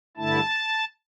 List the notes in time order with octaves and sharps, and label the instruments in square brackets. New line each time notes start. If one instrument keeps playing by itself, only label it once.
[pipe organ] G2 D3 A3 E4 A5